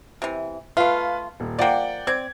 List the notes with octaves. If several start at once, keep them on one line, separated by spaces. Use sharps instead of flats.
C3 E3
A3 F4 B4 F5
D#1
F3 A#3 D5 F#5 G5
C4 D5 G#6